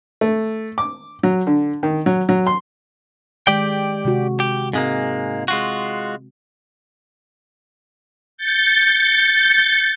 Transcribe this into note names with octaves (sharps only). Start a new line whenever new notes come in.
A3
D6
F#3
D3
D#3
F#3
F#3
C6
D#3 G#3 G4 D5 G5
C3 G#3 F#4
G4
G#2 G#3 A#3 C4
G#3 F4 F#4
G6 A6 C#7